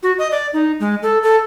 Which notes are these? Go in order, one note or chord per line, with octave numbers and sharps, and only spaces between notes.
F#4
D#5
D5
D#4
G#3
A4
A4